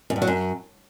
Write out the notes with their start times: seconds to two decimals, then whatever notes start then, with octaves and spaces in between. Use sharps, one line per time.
0.10 F#2
0.16 G2
0.22 F#3
0.27 F#2